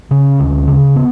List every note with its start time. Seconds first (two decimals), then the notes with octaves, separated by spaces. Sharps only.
0.11 C#3 C#4
0.40 D2
0.68 C#3
0.96 B3